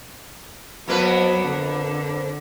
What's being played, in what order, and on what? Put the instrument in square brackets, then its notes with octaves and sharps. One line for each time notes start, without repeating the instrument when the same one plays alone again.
[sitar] F2 A#3 B4 [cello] F#3 B3
[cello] D3